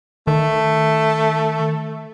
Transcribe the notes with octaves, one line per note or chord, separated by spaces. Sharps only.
D#3 A3